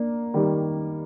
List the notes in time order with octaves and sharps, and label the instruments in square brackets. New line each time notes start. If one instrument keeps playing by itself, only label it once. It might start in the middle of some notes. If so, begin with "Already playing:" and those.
Already playing: [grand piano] A#3 D4
D#3 G3